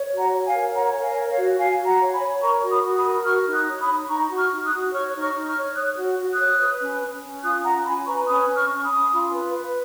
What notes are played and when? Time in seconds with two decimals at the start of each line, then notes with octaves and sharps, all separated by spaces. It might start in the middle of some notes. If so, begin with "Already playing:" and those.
Already playing: C#5
0.12 F#4
0.18 F#5 A#5
0.33 C#5
0.46 F5 G#5
0.53 A#4
0.74 C#5 F#5 A#5
0.95 A#4
1.02 F5 G#5
1.16 C#5
1.30 C#5 F5
1.37 F#4
1.58 F#4 F5 G#5
1.79 F#4
1.86 F#5 A#5
2.00 C#5
2.14 G#5 B5
2.21 C#5
2.42 A#4 A#5 C#6
2.62 F#4
2.70 B5 D#6
2.83 F#4
2.97 B5 D#6
3.05 A#4
3.25 F#4 C#6 F6
3.46 D#4
3.53 D#6 F#6
3.67 C#5
3.81 B5 D#6
3.88 D#4
4.09 D#4 A#5 C#6
4.30 F#4
4.37 C#6 F6
4.51 D#4
4.64 D#6 F#6
4.72 F#4
4.93 C#5 C#6 F6
5.14 D#4
5.21 C#6 F6
5.35 D#4
5.49 C#6 F6
5.56 C#5
5.76 C#5 D#6 F#6
5.97 F#4
6.18 F#4
6.32 D#6 F#6
6.39 C#5
6.60 B4
6.81 C#4
7.02 C#4
7.23 C#4
7.44 F4 D#6 F#6
7.64 C#4 F#5 A#5
7.85 C#4 G#5 B5
8.07 B4 A#5 C#6
8.27 C#4 B5 D#6
8.48 C#4
8.55 C#6 F6
8.69 C#4
8.77 C#6
8.84 B5 D#6
8.90 C#4
9.11 F4
9.32 B4
9.53 B4